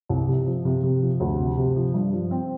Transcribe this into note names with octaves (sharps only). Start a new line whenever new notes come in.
C2
C3
F3
C3
C3
F3
D2
C3
C3
F3
G2
F3
C4